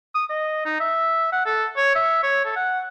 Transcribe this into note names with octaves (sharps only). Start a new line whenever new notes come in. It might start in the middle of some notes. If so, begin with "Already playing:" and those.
D#6
D#5
D#4
E5
F#5
A4
C#5
E5
C#5
A4
F#5